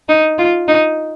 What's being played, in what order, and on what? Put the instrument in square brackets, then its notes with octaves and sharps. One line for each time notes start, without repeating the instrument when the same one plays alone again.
[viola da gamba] D#4
F4
D#4